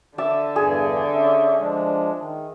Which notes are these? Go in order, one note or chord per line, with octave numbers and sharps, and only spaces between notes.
D3 D5 E5 A5
E2 G2 G#4 G#5
C#4 E5
F3 G#3 D4
D#3